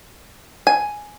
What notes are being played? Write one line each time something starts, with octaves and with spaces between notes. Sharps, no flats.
G#5